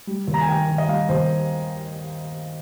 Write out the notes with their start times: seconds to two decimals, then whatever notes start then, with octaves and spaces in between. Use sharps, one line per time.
0.07 G3
0.28 D#2
0.34 A#5
0.41 G#5
0.48 D#3 G5
0.68 D#3
0.78 D#5
0.88 G3 F5
1.09 D#2 C5